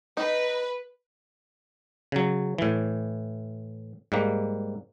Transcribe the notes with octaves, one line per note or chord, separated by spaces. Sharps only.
D#4 B4
C#3 F#3
A2 E3
G#2 G3 A#3